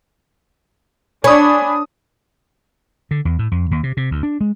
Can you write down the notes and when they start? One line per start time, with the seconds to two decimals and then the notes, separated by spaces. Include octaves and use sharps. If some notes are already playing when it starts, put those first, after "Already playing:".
1.24 D4 C#5 G#5 B5 D#6
3.11 D3
3.25 E2
3.39 A2
3.51 F2
3.71 D#2
3.83 C3
3.97 C3
4.11 D2
4.23 D4
4.41 G#3